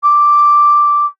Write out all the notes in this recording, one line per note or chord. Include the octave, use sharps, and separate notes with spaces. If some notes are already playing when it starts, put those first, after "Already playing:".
D6